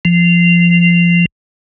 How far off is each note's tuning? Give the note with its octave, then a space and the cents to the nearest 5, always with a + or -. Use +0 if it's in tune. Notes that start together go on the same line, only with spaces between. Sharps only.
F3 -15